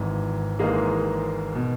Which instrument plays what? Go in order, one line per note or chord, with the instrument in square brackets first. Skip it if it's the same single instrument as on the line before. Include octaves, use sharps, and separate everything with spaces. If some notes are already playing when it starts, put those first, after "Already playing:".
Already playing: [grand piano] G#1 G#2 E3
G#1 G#2 E3 G#3 A#3
B2